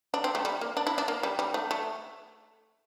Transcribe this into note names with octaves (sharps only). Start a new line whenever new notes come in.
D4
C4
A3
G3
A#3
D4
E4
D4
A#3
G3
G3
A3
A3